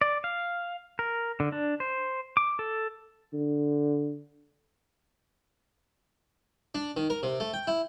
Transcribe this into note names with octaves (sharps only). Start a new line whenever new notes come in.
D5
F5
A#4
D3
D4
C5
D6
A4
D3
D4
D#3
A#4
C3
A3
G5
E4